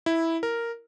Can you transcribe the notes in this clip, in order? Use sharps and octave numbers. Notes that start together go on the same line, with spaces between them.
E4
A#4